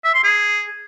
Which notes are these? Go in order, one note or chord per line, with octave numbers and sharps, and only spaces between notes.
E5
C6
G#4